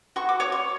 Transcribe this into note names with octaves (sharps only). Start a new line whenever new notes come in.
F#4 C#6
D6
C#5 D6
C#6